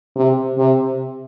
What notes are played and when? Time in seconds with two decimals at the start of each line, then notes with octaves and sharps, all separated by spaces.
0.16 C3
0.58 C3